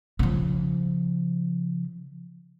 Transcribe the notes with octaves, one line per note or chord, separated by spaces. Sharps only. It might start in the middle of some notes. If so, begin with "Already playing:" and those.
C#3 F3